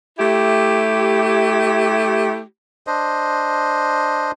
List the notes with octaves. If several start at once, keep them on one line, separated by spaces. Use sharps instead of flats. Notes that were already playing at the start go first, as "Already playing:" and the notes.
A3 E4 G4
D4 C5 D#5